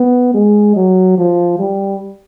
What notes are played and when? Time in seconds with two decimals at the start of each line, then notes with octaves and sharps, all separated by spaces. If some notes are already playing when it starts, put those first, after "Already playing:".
Already playing: B3
0.34 G#3
0.76 F#3
1.18 F3
1.59 G3